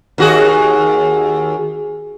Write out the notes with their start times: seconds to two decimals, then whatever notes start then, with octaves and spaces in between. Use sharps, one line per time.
0.18 D#2 F#4 G#4